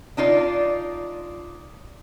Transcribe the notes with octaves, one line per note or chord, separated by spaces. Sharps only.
D4 D#4 F4 D5